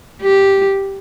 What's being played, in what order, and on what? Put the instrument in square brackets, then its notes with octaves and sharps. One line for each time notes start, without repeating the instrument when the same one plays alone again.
[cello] G4